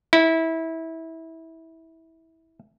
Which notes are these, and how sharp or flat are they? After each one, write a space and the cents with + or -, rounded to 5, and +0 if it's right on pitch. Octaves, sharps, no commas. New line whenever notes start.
E4 -20